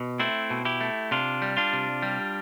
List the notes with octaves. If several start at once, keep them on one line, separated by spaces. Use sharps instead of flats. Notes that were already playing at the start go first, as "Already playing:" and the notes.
Already playing: B2
A3 C4 E4
B2
E4 G4
A3
C3 D4 F4
G3
D4 F4
C3
G3